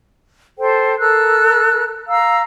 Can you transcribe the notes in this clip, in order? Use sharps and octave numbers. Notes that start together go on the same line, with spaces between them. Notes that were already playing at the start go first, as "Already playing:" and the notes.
A4 C5 G5
A4 A#4 E6 F#6
F5 A#5 E6